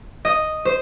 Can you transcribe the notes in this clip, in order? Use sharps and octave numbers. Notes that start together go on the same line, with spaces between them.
D#5
C5